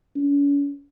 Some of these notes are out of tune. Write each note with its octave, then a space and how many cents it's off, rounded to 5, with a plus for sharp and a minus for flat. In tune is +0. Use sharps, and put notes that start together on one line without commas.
C#4 +40